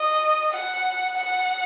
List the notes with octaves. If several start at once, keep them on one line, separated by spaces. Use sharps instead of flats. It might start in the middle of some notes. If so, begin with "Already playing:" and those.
Already playing: D#5
F#5
F#5